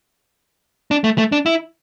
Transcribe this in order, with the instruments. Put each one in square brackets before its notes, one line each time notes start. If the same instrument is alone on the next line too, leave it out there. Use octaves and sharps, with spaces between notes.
[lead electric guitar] D4
A3
A3
D4
E4